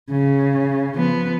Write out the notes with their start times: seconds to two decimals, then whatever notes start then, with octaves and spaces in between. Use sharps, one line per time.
0.11 C#3
0.96 F3 B3